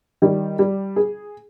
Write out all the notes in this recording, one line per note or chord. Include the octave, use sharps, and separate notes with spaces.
D#3 G3
G3
G#4